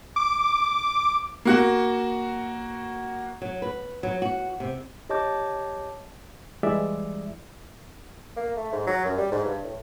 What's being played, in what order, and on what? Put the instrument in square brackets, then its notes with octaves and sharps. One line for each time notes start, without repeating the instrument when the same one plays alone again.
[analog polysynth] D6
[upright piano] A#3 F#4 F#5
[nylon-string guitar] F#3
B4
F#3
F#4
C3
[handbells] G4 C#5 D#5 A5 D6 G6
[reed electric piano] E3 G3 G#3 D5 E5
[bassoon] A#3
A3
G#2
F#3
F#2
G3
G#2
G2
A2